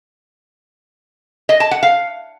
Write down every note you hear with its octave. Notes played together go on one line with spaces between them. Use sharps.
D#5
A5
F#5
F5